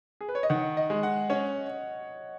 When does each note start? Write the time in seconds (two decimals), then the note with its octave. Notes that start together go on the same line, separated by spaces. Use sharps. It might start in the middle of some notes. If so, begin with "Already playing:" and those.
0.21 G#4
0.29 B4
0.35 C#5
0.43 D#5
0.50 D#3 F#5
0.77 D#5
0.90 G#3
1.03 F#5
1.30 C#4 C#5